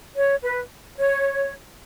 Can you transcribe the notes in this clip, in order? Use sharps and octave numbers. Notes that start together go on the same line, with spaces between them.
C#5
B4
C#5